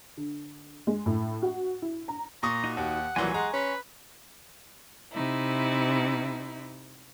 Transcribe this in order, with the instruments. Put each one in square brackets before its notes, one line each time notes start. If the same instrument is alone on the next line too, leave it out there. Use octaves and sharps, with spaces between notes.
[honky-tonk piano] D3
G#3
A2
F#4
E4
A#5
[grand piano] A#2 C#6 D#6 [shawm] A#5
[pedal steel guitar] D#4 F#4
[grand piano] D#2 [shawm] F#5
[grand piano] C2 E3 F#3 [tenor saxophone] A#2 [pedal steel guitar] G#5 C6 C#6
[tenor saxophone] G#3 [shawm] F#5 [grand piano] A#5
[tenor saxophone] C#4 [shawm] B4
[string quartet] C3 D#4 E4